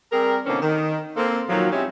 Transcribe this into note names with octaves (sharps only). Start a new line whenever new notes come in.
G3 C4 G#4 A#4
B2 D3 E3 A#3 C4 C#4
D#3
A#3 C4 A4
A#2 D#3 F3 F#3
G#3 C4 C#4 E4 F#4 G4